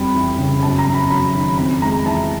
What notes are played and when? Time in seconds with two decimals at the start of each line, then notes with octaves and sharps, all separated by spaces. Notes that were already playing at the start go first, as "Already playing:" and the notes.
Already playing: F2 G3 B5
0.14 E3
0.38 C#3
0.62 F#2 A5
0.79 A#5
0.87 F#2
0.94 B5
1.10 F#3 B5
1.35 D#3
1.58 F2 B5
1.82 G#3 A#5
2.06 E3 A5